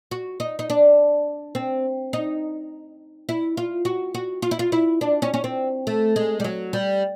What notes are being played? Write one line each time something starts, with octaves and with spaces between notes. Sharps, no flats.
F#4
D#4
D#4
D4
C4
D#4
E4
F4
F#4
F#4
F4
E4
F4
E4
D4
C#4
C#4
C4
A3
G#3
G3
F#3
G3